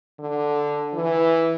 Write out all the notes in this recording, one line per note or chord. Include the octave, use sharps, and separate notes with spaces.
D3
E3